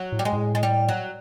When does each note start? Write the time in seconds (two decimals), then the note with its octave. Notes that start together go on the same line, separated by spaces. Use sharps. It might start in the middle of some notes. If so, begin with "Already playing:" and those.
Already playing: F#3
0.12 A2
0.19 G3
0.25 G#3
0.33 G#2
0.37 A2
0.55 G#3
0.63 G3
0.88 F#3